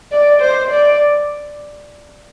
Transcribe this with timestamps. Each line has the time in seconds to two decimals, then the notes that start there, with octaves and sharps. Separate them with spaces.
0.12 D5
0.41 C5
0.70 D5